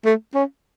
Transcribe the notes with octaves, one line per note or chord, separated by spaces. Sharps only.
A3
C#4